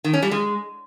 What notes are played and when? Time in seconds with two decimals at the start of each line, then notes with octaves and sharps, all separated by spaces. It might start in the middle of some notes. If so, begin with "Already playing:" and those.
0.04 D#3
0.13 C#4
0.22 G3
0.31 G#3